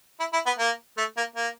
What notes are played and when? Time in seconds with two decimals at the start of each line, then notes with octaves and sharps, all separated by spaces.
0.20 E4
0.33 E4
0.46 B3
0.58 A#3
0.97 A3
1.17 A#3
1.36 A#3